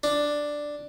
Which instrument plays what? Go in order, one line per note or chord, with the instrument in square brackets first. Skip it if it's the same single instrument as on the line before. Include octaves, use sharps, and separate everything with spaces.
[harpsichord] D4